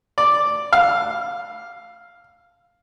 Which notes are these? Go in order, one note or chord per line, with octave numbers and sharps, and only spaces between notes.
D5
F5